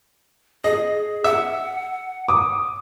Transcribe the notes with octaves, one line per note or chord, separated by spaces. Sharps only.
G#4 D#5
E5 F#5
D6 D#6